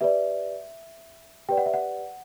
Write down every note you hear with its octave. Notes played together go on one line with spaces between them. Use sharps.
G4 B4 D5 E5
G4 B4 D5 G5
F#5
E5
F#5